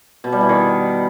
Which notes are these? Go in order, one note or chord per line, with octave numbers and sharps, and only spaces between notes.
B2
G3
E3
D#3